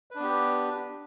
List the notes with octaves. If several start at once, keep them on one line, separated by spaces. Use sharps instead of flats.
B3 D4 G4 B4